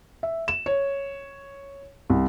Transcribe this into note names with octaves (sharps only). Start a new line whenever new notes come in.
E5
E7
C#5
C2